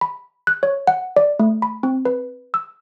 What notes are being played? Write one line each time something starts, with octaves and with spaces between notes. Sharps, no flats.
B5
F#6
C#5
F#5
D5
A3
B5
C4
B4
E6